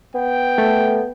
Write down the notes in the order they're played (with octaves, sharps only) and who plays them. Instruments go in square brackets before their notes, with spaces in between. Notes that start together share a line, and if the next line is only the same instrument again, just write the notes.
[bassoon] B3 [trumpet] G5
[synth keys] A3